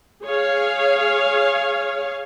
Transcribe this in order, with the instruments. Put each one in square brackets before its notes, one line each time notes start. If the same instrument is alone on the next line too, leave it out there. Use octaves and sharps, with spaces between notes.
[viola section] G#4 C#5 F5